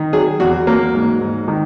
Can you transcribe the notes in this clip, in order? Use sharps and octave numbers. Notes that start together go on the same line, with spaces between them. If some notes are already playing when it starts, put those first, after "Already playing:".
Already playing: D#3
F#3 G#4
E2 F#4
F#3 A#3
G#2
G#2
D#3